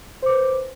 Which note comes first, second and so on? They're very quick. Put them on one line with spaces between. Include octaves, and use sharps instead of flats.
C5 D6 B4